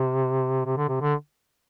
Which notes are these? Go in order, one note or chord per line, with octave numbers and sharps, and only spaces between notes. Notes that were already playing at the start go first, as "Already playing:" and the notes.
Already playing: C3
C3
D3
C3
D3